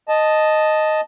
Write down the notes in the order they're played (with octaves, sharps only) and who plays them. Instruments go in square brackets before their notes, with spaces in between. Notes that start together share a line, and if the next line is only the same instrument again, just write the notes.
[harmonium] D#5 A5